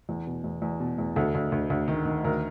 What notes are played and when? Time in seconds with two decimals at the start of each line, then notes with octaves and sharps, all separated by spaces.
0.09 E2
0.27 B2
0.44 E2
0.62 E2
0.80 B2
0.99 E2
1.16 D2 A4
1.35 D2
1.52 D2
1.70 D2
1.88 D#3
2.06 D#3
2.25 D2 A#4